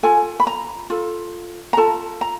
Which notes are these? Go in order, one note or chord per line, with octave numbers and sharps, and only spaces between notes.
F4 A4 G#5
B5
A#5
F4 A4
A#5
F4 A4 A5
A#5